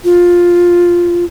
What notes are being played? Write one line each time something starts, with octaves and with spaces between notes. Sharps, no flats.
F4